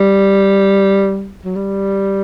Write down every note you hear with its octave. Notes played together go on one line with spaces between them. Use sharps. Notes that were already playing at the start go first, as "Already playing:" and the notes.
Already playing: G3
F#3
G3